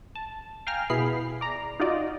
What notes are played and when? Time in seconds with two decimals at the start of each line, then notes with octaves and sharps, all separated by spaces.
0.15 A5
0.67 F5 G5 G#5 A#5 F6
0.90 B2 B3 E4 G#4 B5 C7
1.41 D5 A#5
1.80 D#4 F4 F#4 D5 D#5